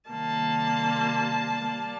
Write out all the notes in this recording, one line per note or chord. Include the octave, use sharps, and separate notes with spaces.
C3 D#3 G3 A#3 A5
G3 A#3